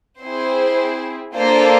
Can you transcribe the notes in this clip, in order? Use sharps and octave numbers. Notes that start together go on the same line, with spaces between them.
C4 E4 G#4 C5
A#3 D4 F4 A4 C5